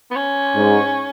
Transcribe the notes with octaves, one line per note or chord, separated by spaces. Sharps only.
B3
C#4
G#2